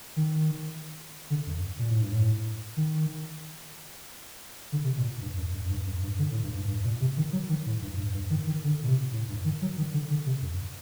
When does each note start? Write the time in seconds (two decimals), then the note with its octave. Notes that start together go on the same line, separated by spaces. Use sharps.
0.16 D#3
1.30 D3
1.47 F#2
1.79 A#2
1.90 A2
2.01 G2
2.12 A2
2.77 D#3
4.72 D3
4.84 C3
4.97 A#2
5.21 G2
5.37 F#2
5.54 F#2
5.70 G2
5.87 F#2
6.03 G2
6.19 D3
6.31 A2
6.43 G2
6.56 G2
6.68 G2
6.84 A#2
7.01 C3
7.17 D#3
7.32 F#3
7.49 D#3
7.66 A2
7.82 G2
7.98 G2
8.14 G2
8.30 D#3
8.47 D#3
8.64 D3
8.83 A#2
8.88 C3
9.12 A2
9.29 G2
9.45 D#3
9.62 F#3
9.77 D#3
9.93 D3
10.10 D3
10.26 C3
10.42 F#2